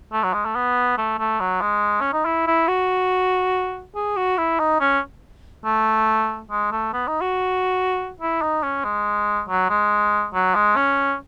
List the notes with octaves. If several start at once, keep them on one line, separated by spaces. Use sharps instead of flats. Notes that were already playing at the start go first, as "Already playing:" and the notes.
A3
F#3
G#3
A3
B3
A3
A3
F#3
G#3
C#4
D#4
E4
E4
F#4
G#4
F#4
E4
D#4
C#4
A3
G#3
A3
B3
D#4
F#4
E4
D#4
C#4
G#3
F#3
G#3
F#3
G#3
C#4